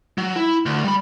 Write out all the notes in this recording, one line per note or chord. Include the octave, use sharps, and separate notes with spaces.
F#3
E4
D2
G3 B5